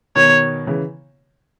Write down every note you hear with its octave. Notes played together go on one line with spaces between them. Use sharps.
B2 D#3 C#5
C#3 E3